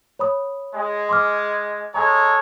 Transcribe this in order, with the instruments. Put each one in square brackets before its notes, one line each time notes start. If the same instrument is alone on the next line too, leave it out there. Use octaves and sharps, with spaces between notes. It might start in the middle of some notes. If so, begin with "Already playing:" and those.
[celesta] C#5 B5 D#6
[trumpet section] G#3
[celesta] C6 D6 F6
[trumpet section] G#3 A4 C#5 [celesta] G#5 A#5